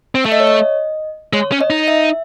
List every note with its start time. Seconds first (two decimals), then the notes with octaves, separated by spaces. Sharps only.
0.15 C4
0.25 A3 E5
0.32 D#5
0.40 C#5
0.47 D#5
1.33 G#3 C#5
1.52 C#4
1.61 D#5
1.70 D#4
1.88 E5